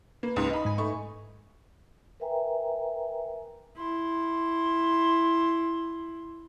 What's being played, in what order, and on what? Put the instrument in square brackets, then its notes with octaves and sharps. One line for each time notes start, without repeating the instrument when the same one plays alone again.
[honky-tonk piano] A#3 [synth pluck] B4
[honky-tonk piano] C#2 G#2 D#6
D#4 B5
[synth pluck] G#2 G#5
[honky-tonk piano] A3 D#4 C#6
[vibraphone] A#4 B4 E5 G5 G#5 A#5
[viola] E4 C6